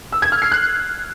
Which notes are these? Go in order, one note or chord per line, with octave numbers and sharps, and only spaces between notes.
E6
G#6
F6
C7
F#6